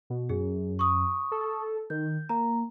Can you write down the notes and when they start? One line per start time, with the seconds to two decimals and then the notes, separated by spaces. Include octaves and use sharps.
0.10 B2
0.29 F#2 G#4
0.79 C#6 D#6
1.31 A4
1.90 D#3 G6
2.29 A#3 A#5